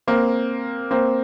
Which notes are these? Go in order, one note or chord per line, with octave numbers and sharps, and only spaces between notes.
A#3 C4
A#3 C4